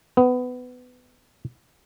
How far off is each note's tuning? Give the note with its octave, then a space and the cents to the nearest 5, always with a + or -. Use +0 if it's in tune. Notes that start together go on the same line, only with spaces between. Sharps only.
B3 +20